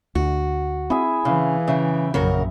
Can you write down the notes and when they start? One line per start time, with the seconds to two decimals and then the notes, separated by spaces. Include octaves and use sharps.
0.15 D2 F#4
0.90 C4 E4 G#4 E5
1.25 C#3 E3 F5
1.68 C#3 E5 G5
2.14 A#1 F#2 C#3 A#4 F#5